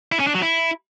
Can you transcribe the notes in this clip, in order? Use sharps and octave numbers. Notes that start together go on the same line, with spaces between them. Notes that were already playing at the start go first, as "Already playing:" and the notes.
E4
C#4
D4
F#3
E4